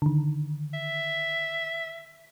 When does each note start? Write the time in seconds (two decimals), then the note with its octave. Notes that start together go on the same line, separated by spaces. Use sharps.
0.02 D3 D#3
0.74 E5